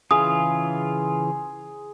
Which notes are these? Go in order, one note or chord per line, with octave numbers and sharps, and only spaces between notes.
C#3 E3 F4 G#4 D#6